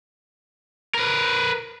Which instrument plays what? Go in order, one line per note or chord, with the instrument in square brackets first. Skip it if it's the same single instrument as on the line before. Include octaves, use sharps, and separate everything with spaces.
[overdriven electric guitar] A#4 B4